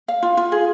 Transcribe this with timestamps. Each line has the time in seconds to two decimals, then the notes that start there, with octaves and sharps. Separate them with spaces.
0.08 F5
0.22 F4
0.37 F4
0.52 G#4